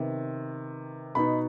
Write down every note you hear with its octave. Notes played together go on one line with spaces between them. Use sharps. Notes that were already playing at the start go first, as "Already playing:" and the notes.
Already playing: C3 D#3 B3
B2 B3 D#4 B5